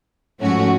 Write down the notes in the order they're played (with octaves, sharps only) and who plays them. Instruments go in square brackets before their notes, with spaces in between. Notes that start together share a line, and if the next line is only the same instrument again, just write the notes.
[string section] G#2 F3 A3 C#4 F#4